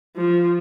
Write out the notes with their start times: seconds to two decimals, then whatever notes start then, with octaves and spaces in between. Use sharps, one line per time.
0.16 F3